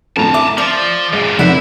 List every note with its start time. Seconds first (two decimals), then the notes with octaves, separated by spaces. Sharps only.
0.16 F2 A2 D3 A5 A#5
0.34 E5 D6
0.58 F3 D5
1.13 F#2 A#2 G#3
1.39 F1 D#4 E4 F#5